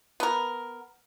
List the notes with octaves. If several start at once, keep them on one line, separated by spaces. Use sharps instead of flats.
B3 A#4